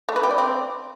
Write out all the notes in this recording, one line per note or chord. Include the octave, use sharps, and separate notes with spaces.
A3
B4
G4
D5
C4